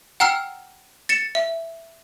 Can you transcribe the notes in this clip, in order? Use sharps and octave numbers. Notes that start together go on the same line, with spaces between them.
F#5 G5 A#5 E6 F6 C7
A6 C#7 E7
E5